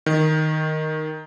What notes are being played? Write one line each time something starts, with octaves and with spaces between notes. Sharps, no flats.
D#3